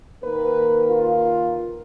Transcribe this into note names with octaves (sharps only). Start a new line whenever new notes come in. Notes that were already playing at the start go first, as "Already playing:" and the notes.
D#3 A#3 A#4 B4
F4